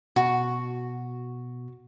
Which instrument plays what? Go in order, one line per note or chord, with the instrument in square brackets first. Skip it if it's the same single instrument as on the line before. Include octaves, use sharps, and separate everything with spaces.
[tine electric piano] B2 [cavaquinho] F#4